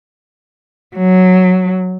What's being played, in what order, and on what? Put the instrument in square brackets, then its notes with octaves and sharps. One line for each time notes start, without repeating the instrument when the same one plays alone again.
[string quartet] F#3